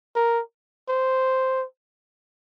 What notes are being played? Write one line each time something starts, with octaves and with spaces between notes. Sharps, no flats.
A#4
C5